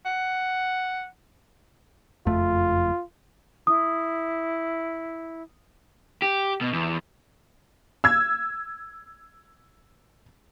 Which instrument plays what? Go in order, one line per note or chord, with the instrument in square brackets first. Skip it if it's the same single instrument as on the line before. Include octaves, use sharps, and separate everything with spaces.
[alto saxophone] F#5
[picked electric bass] F#1 F2 A3 [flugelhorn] F4
[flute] E4 [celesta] D#6
[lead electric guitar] G4
B2
E2
[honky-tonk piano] E6 G#6